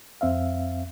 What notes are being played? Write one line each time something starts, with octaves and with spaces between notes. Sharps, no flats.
F2 C4 E5 F5